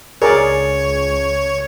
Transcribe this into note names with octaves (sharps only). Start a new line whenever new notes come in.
C#2 G#4 A#4 C#5 D5